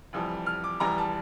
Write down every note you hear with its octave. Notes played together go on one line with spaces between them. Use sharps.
F1 F2 E3 G3
F6
D6
F1 E2 E3 G3 A#5
A5